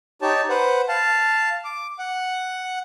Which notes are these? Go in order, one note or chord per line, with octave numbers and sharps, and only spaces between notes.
D#4 G4 C#5 A5
B4 C5 F#5
F5 A5
D6
F#5